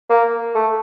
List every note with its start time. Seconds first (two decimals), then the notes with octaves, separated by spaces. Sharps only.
0.10 A#3
0.55 A3